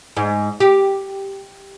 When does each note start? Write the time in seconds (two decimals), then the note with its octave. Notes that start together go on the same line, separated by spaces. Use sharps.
0.17 G#2
0.60 G4